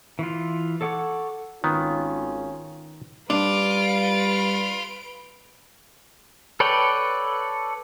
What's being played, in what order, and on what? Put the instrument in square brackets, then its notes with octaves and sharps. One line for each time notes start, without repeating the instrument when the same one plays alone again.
[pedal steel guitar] E3 F4
A4 C#5 F#5 D6
[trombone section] G#1 C#4 F4 [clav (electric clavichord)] D#3 B3
[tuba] G3 [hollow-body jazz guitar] D4 [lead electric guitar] F4 [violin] B4 D7
[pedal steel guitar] A4 B4 C#5 D5 G5